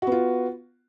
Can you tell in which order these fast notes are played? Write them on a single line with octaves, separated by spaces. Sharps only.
F#4 B3 F4